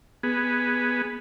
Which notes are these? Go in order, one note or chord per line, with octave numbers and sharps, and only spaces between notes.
B3 G#4